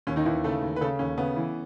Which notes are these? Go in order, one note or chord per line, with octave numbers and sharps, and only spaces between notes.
D#2 C#4
D#3 D#4
D#2 E3 E4
C#3 A3 A4
D#2
B4
C#3 A3 A4
D#2 C#4
C#3 B3
E3